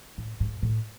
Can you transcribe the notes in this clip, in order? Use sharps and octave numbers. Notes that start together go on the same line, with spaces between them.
A2
G#2
A2